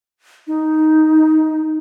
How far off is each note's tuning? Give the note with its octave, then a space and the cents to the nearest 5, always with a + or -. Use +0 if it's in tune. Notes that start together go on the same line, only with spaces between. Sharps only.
D#4 +5